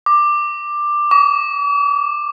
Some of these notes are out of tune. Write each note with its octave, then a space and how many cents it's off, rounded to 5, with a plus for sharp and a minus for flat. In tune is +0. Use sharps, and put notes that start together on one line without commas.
D6 +10
D6 -45